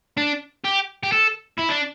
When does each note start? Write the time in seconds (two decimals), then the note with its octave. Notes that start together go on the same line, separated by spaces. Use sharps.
0.17 D4
0.64 G4
1.03 G4
1.12 A4
1.59 E4
1.71 D4